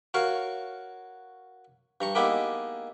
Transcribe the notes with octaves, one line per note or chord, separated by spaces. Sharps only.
F#4 A#4 C#5 F5 C#6
G2 A#5 C#6
G#3 A#3 B3 D#4 E4 G4